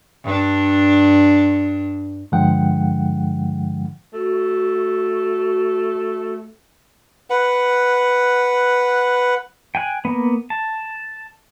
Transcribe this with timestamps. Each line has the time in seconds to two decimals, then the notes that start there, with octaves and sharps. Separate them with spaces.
0.24 G2 D4
2.32 G2 D3 F3 G#3 F#5 G5
4.13 A3 F#4
7.30 B4 F#5
9.75 G5 G#5 F#6
10.05 A#3 B3
10.50 A5